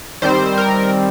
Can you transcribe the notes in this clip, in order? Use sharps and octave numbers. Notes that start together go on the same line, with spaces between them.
D#3 G3 C4 C5
A#4